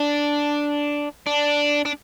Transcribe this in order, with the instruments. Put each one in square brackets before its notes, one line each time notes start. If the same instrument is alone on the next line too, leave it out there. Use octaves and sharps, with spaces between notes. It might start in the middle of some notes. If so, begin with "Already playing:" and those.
Already playing: [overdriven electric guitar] D4
D4
D4